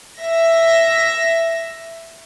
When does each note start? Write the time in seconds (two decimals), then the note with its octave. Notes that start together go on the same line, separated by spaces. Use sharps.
0.19 E5 A#6